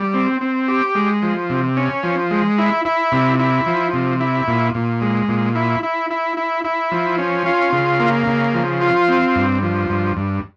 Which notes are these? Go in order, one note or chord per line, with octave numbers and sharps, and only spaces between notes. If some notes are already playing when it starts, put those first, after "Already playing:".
Already playing: G3
C4
C4
G4
G#3
F3
C3
C#4
F3
G#3
E4
E4
C3
E4
F3
C3
E4
A#2
A#2
G#3
A#2
E4
E4
E4
E4
E4
F3
C#4
F4
C#3
A#3
C#3
F3
F4
C4
G2
F3
G2
G2